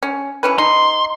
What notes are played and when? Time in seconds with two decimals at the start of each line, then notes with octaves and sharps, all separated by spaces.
0.03 C#4
0.43 E3 C#4 B4
0.58 D#4 C6